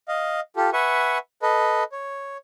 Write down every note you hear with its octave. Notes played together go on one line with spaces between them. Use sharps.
D#5 F5
F4 G4 A4
B4 E5 F#5 G#5 C#6
A4 B4 D#5
C#5